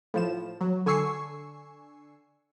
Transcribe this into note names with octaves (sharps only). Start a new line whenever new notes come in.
A2 F3 E7
F#3
D3 G#5 C#6 E6 C7 C#7